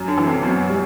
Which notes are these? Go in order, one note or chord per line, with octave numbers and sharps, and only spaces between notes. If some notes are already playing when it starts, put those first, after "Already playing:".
Already playing: F#2
D3
E3
C3
F#2 B2
G3